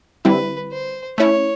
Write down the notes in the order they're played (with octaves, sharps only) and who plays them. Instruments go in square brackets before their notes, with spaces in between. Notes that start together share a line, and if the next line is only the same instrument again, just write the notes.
[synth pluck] D3 G3 C4 E4 [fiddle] B4
[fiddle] C5
[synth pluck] A3 C#4 E4 [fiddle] C#5